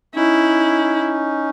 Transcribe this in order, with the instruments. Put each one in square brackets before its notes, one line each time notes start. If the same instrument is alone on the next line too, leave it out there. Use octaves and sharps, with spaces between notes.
[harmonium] C#4 D#4 [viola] E4